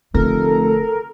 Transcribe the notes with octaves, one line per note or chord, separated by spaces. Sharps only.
F1 D3 A3 A4 A#4